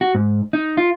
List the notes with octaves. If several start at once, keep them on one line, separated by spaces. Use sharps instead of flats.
F#4
G#2
D#4
F4